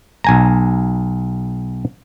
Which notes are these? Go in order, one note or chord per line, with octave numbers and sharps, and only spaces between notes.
B1 G#5 A#5